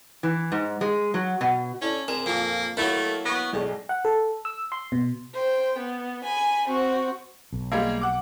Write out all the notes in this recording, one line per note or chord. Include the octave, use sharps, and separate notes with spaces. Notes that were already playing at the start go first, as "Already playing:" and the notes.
E3
G#2
G#3
F#3
B2
C#4 E4 A4 D5
C3 G#4 A#4 E7
F2 A#2 A#3
F#3 A3 A#3 E4 A#4 B5 F7
B3 C#6 A#6
B1 A2 G#3 D5
F#5
A4
E6
C6
B2
C5 G5
B3
G#5 B5
C4 F#4
B1
G3 G#3 A#3
F#5 D6